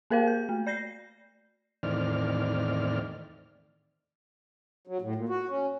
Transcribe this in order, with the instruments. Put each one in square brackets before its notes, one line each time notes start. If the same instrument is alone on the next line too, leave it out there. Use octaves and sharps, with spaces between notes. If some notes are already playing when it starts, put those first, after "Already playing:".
[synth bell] A#3 G#4 A#4 C5 F5
G6
A3
D5 G6 A#6 C7
[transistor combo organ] E2 A2 D#3 C4 D5 F6
[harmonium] F#3
A2
A#2
F#4
C#4